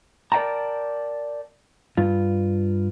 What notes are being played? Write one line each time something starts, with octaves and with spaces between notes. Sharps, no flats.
A#4 D5 F5 G5 A5 A#5
G2 F4